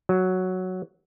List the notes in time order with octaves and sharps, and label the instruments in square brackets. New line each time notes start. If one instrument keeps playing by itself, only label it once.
[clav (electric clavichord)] F#3